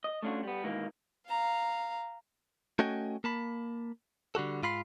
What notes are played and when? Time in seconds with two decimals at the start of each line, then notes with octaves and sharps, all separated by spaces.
0.04 D#5
0.23 A3 C#4 D4 F4 F#4
0.43 G3 B3
0.64 G#2 B2 D#3 E3 A#3
1.28 F5 A#5
2.79 A3 C#4 F#4 D#5 G5 G#5
3.24 A#3 A5 B5
4.35 D3 G3 F#4 A4
4.63 G#2 F4 B5 C6